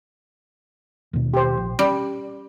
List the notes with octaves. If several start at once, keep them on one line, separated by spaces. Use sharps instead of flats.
D#2 B2
G4 C5
A#1
G3 C#4